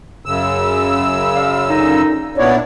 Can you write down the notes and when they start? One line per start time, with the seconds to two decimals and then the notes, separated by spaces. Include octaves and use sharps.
0.26 F#2 C#3 E6
1.35 D5 F5
1.70 A#2 D3 D#4
2.38 A#2 B3 D4 E4 C#5 D5